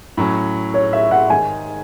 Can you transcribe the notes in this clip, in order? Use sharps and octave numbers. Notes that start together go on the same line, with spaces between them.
A2 F#3 C#4
C#5
E5
F#5
G#2 D#3 G#3 G#5